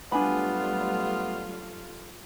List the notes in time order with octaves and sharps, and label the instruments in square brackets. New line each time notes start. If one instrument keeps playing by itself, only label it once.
[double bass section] F#3 G3 [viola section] A3 F4 [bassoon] B3 [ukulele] D4 G#5 B5